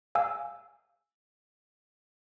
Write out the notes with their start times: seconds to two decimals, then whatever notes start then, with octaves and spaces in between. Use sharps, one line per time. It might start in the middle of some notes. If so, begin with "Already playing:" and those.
0.15 F5 G#5 E6